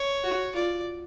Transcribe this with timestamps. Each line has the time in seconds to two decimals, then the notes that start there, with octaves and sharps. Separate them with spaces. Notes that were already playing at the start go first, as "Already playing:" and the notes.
Already playing: C#5
0.24 F#4
0.54 F4 D5